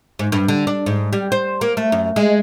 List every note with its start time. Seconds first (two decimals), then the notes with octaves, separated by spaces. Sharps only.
0.19 G#2
0.32 G2
0.48 D3
0.67 D4
0.86 G#2
1.13 G3
1.32 C5
1.61 A#3
1.77 A3
1.92 F#2
2.16 G#3